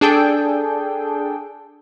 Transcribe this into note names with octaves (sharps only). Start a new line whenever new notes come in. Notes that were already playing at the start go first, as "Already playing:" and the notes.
D4 G#4 A4 G5